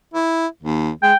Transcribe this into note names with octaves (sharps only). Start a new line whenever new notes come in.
E4
D#2
G#3 G5